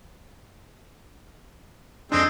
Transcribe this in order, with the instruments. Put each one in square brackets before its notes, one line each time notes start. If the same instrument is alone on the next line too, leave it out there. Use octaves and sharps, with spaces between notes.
[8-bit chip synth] F2 D4 [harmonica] G#3 C4 D#4